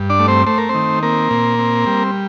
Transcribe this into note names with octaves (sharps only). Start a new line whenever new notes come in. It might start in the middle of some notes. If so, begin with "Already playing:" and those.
Already playing: G2
D4 D5
A3
C4 C5
A3 C5
A#4
C4 C5
D#3
A#3 C4 A#4
A#2
C4
G3